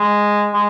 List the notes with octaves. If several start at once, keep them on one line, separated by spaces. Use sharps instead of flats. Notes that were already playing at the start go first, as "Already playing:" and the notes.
Already playing: G#3
G#3